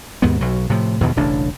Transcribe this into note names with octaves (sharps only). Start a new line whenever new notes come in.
D#2 G#2 B2 B3
B1 F#3
A2 C3 F3
E2 G2 B2 D#3
E1 A1 C#3 D4